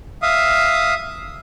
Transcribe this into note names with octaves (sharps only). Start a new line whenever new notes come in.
E5 F5 D#6